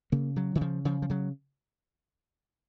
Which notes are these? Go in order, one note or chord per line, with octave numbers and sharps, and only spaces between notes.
C#3 A#3
C#3 F#3
D#3
C#3 F3
C#3 F3
F3
C#3 F#3